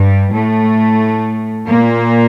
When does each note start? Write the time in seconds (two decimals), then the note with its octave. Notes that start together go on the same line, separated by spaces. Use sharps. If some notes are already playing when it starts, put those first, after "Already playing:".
Already playing: G2 G3
0.32 A2 A3
1.68 A#2 A#3